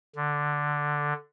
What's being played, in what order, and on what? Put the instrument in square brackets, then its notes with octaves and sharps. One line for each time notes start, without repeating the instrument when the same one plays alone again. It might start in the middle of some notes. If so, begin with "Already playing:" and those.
[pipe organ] D3